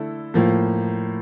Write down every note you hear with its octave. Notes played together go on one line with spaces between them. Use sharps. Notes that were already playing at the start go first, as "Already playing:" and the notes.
Already playing: D3 A3 E4 A4
A2 F3 A#3